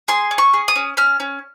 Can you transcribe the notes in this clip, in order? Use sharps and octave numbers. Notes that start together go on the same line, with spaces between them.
G#4 C6
C#4
C#6
G#4
D#6
C#4
C#4 F6
C#4